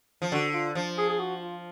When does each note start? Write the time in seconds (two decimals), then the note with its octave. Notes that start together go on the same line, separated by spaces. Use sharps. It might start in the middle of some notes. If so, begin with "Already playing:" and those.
0.22 F3
0.32 D3 F#4
0.54 F4
0.75 F3
0.98 G#4
1.09 G#4
1.19 F#4
1.41 F4